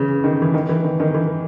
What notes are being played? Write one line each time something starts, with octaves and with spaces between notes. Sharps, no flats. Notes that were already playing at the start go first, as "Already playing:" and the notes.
Already playing: C#3 E3
D#3
E3
D#3
E3
D#3
D#3
E3